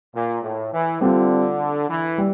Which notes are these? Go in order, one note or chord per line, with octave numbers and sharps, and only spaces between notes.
A#2
A2
E3
D3 G3 C4 F4
E3
G3